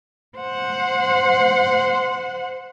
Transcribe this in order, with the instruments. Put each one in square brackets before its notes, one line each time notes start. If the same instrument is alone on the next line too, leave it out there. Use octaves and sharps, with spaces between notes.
[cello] C5 F#5